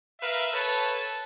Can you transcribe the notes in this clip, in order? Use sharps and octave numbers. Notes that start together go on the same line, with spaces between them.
A#4 B4 E5 F5
A4 B4 C#5 A5